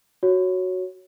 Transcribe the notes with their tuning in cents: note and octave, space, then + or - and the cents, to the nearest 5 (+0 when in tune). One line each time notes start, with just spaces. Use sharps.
F#4 +0 C#5 +0